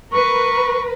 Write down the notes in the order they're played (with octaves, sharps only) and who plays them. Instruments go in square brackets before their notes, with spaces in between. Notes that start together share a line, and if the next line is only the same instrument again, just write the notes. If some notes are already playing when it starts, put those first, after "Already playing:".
[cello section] A#4 B4 [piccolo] C#6